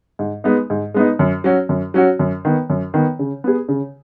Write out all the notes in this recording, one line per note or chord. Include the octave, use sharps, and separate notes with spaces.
G#2
G#3 B3 D#4
G#2
G#3 B3 D#4
F#2
F#3 C#4 F#4
F#2
F#3 C#4 F#4
F#2
D#3 B3
F#2
D#3 B3
C#3
B3 G#4
C#3